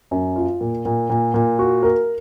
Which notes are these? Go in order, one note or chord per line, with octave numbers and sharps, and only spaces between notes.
F#2
F4
A#2
A#2
A#2
A#2
F#4
A#4